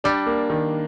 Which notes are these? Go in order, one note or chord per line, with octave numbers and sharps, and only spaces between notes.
G3 D4
A#3
D#3